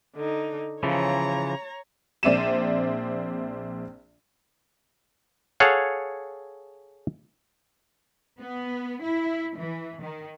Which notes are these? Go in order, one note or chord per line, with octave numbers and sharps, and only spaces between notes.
D3 D#4
C#3 E3 F3 C#5 A#5
A#1 C4 D5 E5 D#7 E7
G#4 A4 C#5 F5 F#5
B3
E4
E3
D#3